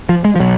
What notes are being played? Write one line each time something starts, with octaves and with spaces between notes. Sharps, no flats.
F3
G#3
F3
B2 F#3